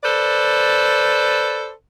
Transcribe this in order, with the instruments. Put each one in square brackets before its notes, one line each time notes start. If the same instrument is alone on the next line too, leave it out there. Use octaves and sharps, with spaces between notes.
[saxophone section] A4 B4 C5 D5